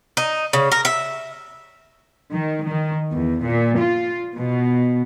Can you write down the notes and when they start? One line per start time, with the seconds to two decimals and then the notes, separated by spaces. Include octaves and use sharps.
0.17 D#4
0.53 C#3
0.72 A#4
0.85 E5
2.32 D#3
2.66 D#3
3.11 E2
3.44 A#2
3.80 F4
4.37 B2